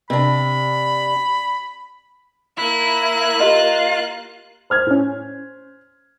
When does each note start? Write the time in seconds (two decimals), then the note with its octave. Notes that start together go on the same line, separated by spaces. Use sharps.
0.10 C3 D4 B5
2.58 A#3 E4 F#6
3.40 F4 G4 D#5
4.70 C5 F6 G#6
4.87 A2 C#4